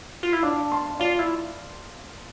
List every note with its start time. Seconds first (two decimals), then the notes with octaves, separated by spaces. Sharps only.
0.23 F4
0.33 E4
0.43 D4 D5 F5
0.72 A5 C6
1.00 F4 D5 F5
1.19 E4